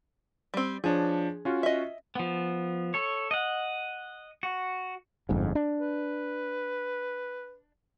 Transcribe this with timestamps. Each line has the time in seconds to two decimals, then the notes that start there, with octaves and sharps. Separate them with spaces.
0.54 G3 C4
0.84 F3 D4 G#4 C#5
1.45 C#4 F4 F#4
1.63 D#5 E5
2.15 F3 B3
2.94 A4 C#5
3.31 D#5 F#5
4.43 F#4
5.29 G1 F2 G#2
5.55 D4
5.80 B4